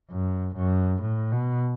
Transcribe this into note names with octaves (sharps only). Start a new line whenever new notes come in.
F#2
F#2
A2
B2